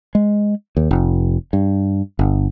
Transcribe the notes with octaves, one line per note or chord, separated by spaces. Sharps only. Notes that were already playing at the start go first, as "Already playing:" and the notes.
G#3
D#2
F1
G2
G1